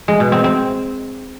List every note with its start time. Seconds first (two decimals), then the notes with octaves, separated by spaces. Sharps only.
0.08 G#3
0.20 B2
0.32 C4
0.44 C4